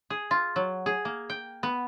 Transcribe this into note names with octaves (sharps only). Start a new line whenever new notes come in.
G#4
F4
F#3
G#4
A#3
G5
B3